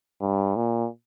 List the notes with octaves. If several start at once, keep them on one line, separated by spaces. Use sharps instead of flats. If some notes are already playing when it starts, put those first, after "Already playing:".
G2
A#2